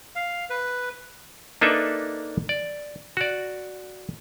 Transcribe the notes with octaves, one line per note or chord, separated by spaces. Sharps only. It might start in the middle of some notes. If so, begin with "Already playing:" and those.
F5
B4
A#3 D4 D#4 A4 B4 E5
D5
F#4 D5